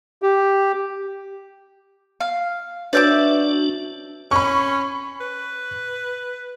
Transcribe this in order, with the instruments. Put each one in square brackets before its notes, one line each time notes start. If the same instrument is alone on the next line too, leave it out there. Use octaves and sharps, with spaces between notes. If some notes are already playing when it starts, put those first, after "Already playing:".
[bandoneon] G4
[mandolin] F5
[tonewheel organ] D4 [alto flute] F#4 [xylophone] B4 C#5 G6 [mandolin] D5 E5 D6
[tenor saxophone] C#4 [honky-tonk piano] B5 C#6
[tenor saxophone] B4